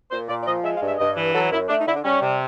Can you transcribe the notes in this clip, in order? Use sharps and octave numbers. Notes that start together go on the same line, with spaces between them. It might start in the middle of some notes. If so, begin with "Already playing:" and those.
A#2 C5
A#2 D5
D5
F3 D#5
G#3 E5
F5
G2
E5
G2 D#5
E3
F#3 A4
F#2 E4
A3 D4
D#4
D3 E4
D4
G3 C#4
C3